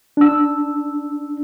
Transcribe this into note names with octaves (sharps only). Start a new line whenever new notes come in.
D4 E6